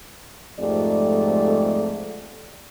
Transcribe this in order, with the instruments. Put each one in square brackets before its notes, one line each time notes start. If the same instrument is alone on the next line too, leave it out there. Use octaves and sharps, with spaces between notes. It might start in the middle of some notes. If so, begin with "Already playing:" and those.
[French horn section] F2 G#2 G#3 A3 G4 D5